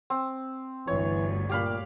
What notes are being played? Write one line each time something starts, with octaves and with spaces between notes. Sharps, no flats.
C4
G1 D2 E3 C#5
A#2 G4 F5 B5